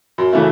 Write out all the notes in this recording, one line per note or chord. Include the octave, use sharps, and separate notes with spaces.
F#2
C#3 E3 A3 E4